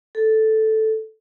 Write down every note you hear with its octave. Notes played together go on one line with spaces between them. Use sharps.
A4